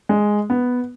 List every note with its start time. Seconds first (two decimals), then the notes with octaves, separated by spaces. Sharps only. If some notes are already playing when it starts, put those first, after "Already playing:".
0.09 G#3
0.50 B3